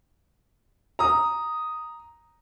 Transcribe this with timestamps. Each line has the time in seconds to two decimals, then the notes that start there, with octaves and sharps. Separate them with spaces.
0.99 A#5 D#6